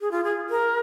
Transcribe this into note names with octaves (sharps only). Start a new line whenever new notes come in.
G#4
F4
G#4
A#4